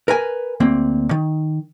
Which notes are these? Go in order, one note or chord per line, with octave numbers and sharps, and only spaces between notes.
A#4 B4 G#5
D2 A#3 C4
D#3